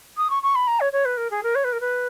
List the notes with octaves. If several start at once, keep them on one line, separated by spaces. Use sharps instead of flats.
D#6
C#6
C#6
B5
A#5
C#5
C#5
B4
A#4
G#4
A#4
C#5
B4
A#4
B4